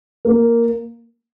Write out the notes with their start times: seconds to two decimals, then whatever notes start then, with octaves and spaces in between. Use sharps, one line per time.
0.25 A#3